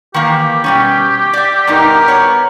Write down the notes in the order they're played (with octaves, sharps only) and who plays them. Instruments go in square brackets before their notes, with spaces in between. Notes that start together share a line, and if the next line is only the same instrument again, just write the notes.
[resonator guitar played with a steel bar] D#3 E3 A#3 [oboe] G4
[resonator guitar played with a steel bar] B2 G3 C#4
D5 E5
[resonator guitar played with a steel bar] G2 B2 D#4 [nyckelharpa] A#4
[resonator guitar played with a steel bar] B3 C#5